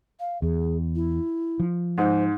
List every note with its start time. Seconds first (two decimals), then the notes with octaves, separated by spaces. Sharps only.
0.20 F5
0.42 E2 G#4
0.96 E4
1.60 F3
1.98 G#2 C5